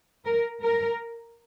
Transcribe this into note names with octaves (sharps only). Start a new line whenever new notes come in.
A#4
A#4